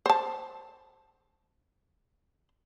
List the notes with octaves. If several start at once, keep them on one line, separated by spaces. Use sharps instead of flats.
C5 A5